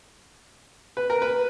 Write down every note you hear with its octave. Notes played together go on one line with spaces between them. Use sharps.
B4
A#4
B4